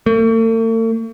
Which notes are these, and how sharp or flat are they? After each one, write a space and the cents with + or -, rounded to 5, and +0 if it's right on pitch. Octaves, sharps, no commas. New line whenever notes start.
A3 +45